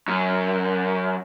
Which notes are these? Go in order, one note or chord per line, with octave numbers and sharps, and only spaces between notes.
F#2